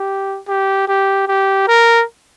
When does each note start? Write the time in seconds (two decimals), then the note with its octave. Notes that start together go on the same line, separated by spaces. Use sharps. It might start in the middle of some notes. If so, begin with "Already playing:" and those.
Already playing: G4
0.48 G4
0.88 G4
1.28 G4
1.68 A#4